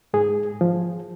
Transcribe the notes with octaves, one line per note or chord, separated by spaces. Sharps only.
G#2 G#4
F3